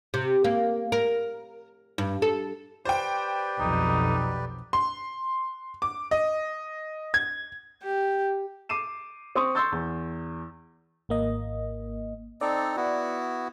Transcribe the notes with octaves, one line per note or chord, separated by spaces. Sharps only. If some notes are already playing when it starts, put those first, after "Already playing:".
C3
A#3
A#4
G2
A4
G4 B4 C5 D5 G5
B1 F2 B2 D#4
C6
D6
D#5
G#6
G4
D6 C7 D#7 E7
C4 C#6 D#6
C6 C#6 E6 G6 A6
E2
G#1 A#3 D#5
C4 D#4 A4 D5
B3 E4 F#4